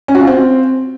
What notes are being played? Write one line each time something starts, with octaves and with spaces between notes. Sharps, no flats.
C#4
F#4
F4
C4